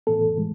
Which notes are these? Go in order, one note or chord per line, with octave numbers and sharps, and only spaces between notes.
A2 E3 B3 A4
A2 E3 G#3